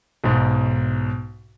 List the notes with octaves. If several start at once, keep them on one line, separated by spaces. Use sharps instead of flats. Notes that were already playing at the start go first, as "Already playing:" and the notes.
B1 G#2